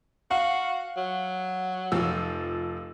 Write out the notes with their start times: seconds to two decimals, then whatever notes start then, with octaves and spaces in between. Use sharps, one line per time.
0.31 F#4 F5 F#5
0.97 F#3
1.92 F1 F3 E6